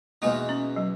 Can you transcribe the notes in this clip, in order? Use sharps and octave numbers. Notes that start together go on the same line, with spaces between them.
E2 B2 G#3 A#3 D#4
C#4
F#3